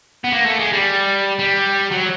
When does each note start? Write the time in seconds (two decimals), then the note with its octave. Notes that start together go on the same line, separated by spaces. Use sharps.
0.24 B3
0.33 A#3
0.46 A3
0.59 G#3
0.73 G3
1.39 G3
1.92 F#3